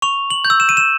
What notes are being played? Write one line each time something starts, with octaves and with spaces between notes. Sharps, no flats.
C#6 F7
F#7
G6
E6
E7
D#7
E7